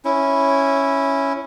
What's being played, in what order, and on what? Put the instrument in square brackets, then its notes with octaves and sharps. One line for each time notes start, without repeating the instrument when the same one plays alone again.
[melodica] C#4 E4